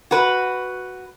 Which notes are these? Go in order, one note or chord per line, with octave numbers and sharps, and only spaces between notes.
F#4 B4